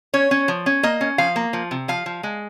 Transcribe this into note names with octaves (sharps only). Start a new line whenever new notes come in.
C#4 C#5
C#4
F3
C#4
A#3 D#5
C#4
F3 F5
A#3
F3
C3
F3 F5
F3
G#3